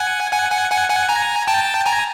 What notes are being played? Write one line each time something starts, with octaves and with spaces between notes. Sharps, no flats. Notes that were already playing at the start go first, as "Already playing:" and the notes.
Already playing: F#5 G#5
F#5 G#5
F#5 G#5
F#5 G#5
F#5 G#5
G#5 A#5
G5 A5
G#5 A#5